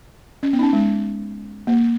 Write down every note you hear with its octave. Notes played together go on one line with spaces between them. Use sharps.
C#4
B3
D#4
C#4
G#3
A#3